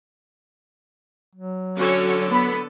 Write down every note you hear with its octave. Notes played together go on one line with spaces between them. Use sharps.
F#3
D3 C#4 F#4 A4 C#5
B3 B5